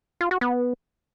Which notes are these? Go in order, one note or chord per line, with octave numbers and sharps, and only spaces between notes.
F4
F#4
B3